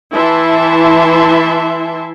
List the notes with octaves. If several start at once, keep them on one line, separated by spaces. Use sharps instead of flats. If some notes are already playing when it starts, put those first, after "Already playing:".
E3 E4 E5 A5 C6